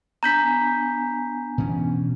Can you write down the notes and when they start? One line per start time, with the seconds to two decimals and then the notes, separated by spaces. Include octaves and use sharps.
0.23 B3 D4 G#5 A#5 G6 B6
1.58 B2 E3 C#4